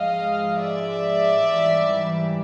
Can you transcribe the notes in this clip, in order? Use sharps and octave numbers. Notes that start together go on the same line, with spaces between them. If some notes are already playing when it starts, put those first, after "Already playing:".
Already playing: G#2 F3 G#3 D#5 F5
D5 E5
G#2 E3 G3